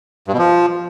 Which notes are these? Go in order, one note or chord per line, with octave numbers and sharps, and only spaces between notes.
G2
B2
F3